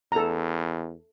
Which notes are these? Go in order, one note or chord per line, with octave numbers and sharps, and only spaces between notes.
E2 A4 A#5